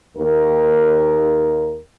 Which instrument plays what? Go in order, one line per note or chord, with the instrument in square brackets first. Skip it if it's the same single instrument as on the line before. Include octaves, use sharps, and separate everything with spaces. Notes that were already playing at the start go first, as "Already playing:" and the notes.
[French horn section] D#2 A#4